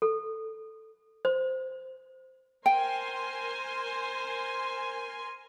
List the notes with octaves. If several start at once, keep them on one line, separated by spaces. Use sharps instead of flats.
A4
C5
A#4 C5 G5 G#5 C6